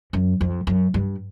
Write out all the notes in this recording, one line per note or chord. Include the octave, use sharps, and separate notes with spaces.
F#2
F2
F#2
G2